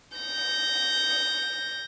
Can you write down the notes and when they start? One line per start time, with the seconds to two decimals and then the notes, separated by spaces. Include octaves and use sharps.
0.17 G6 A#6